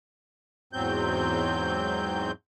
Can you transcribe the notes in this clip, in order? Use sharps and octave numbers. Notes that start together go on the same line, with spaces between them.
E2 G#2 F#3 C4 G6